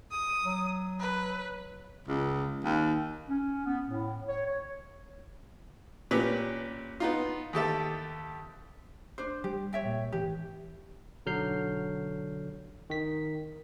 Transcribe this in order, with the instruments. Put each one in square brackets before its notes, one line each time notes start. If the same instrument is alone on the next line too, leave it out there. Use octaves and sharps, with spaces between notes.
[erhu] D#6
[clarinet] F#3
[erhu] B4
[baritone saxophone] C#2
D#2
[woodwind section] C#4
B3
A2
C#5
C#5
[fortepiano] A#2 C#4 G4 B4
B3 D#4 F4
D#2 G4 A4 E5
[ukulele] D4 C5
[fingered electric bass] G3 [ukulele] G4
[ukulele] C#5 E5 G5
[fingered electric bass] A#2
[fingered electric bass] G#1 E3 [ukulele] G4
[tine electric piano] B1 D3 F#3 F6 G6 C7
D#3 B6